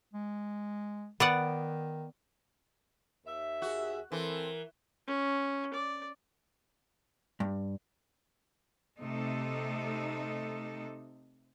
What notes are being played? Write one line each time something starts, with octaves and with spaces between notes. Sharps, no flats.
G#3
D#3 B3 D5 F#5
D#2 E5
F#4 G#4
E3 C4 A4 A#4
C#4
D5
G2
C3 A3 D#4 A4